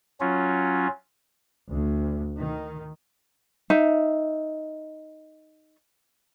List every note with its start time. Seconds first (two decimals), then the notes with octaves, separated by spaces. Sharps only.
0.20 F#3 C#4 F4
1.70 D2
2.38 D#3
3.70 D#4 E5